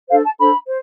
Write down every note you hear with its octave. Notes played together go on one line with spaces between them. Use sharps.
D4 A4 C5 F5
A5
D4 A4 C5 B5
C5